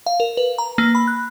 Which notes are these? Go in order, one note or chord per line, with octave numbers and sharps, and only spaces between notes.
F5
A#4
B4
A#5
A#3
B5
F#6